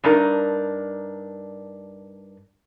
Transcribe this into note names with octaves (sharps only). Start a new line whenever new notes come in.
G2 D4 D#4 A#4